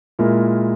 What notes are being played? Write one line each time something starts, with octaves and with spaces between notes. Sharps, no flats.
A#2 G#3 E4 A#4